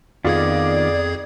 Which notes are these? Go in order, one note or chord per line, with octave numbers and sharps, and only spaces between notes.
F2 D#3 B3 F4 G#4 D5 G#6